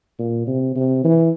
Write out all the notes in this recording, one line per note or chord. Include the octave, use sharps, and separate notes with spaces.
A#2
C3
C3
E3